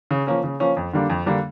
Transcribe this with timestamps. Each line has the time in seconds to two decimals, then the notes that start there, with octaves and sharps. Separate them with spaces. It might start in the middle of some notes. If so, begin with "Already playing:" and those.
0.11 C#3
0.27 F3 A#3 C#4
0.44 C#3
0.60 F3 A#3 C#4
0.77 F2
0.93 D3 G3 A#3 D4
1.10 F2
1.26 D3 G3 A#3 D4